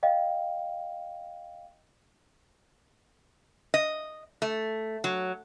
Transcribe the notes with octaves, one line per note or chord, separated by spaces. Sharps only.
D#5 F5 G5
D#5
A3
F#3